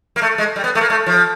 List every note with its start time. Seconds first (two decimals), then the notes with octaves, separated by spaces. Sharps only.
0.16 A#3
0.22 A3
0.38 G#3
0.56 G3
0.64 B3
0.75 A3
0.81 A#3
0.90 A3
1.06 F3